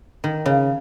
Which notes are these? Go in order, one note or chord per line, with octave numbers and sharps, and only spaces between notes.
D#3
C#3